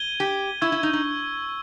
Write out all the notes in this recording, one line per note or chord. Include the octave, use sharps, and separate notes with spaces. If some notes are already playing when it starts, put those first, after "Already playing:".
Already playing: G#6 D#7 G7
G4
E4 C#6 E6 G#6
E4
D#4
D#4